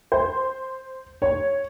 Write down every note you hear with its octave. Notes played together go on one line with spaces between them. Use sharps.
C5
C#5